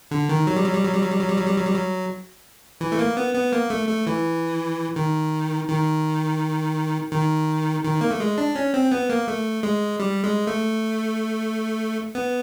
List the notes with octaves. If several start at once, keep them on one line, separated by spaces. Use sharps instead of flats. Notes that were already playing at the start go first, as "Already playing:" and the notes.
D3
D#3
F#3
G3
F#3
G3
F#3
G3
F#3
G3
F#3
G3
F#3
G3
F#3
G3
F#3
E3
A3
A#3
B3
B3
A#3
A3
A3
E3
D#3
D#3
D#3
D#3
A#3
A3
G#3
D4
C#4
C4
B3
A#3
A3
G#3
G3
G#3
A3
B3